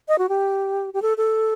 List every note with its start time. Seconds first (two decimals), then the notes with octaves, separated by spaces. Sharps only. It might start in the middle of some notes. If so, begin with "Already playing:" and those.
0.08 D#5
0.18 F#4
0.29 G4
0.94 G4
1.02 A4
1.17 A4